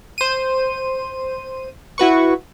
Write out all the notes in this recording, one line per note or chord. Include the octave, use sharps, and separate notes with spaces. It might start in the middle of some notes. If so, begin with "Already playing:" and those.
C5 D#7
E4 F#4 B4 C#6